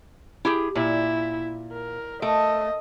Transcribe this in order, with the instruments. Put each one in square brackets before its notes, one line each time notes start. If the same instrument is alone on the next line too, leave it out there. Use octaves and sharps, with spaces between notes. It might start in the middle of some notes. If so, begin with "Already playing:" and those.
[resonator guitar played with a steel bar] E4 G4 G#4
[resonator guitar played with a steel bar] A#2 [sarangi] E4
[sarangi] A#4
[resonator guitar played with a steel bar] A3 [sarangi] D#5